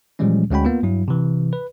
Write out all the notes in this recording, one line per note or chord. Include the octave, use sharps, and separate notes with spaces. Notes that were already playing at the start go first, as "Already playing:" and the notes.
A#2 E3 F3 G3 G#3 C#4
D2 G#3 C#4 F#4 G5 B5
A#3 B3 F4
G2 F#3 E4
C3 E3
B4